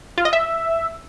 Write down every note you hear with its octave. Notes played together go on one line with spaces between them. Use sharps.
F4
D#5
E5